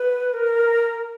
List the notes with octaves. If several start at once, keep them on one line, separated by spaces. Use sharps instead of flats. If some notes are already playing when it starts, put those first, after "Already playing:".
Already playing: B4
A#4